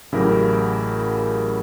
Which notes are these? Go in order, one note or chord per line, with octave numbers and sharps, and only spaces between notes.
A1 C#3 F#3 E4 G4 A#4